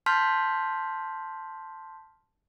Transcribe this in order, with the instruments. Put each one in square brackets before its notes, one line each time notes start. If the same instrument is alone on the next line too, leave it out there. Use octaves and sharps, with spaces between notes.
[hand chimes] A5 C6 F6 G6 B6